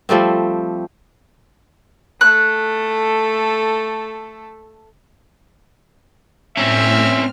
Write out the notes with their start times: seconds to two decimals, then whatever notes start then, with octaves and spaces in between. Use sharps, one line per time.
0.09 F3 G3 A3 C4
2.21 A3 A4 F#6
6.57 A2 C4 C#4 E5 F6